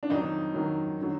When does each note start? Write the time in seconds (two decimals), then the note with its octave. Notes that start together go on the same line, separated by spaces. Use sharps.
0.03 D4
0.10 F2 D#3 F#3 D#4
0.54 F2 D#3 F#3
1.00 D3 F#3